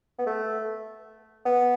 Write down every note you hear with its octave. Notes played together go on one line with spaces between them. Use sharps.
B3
A3
B3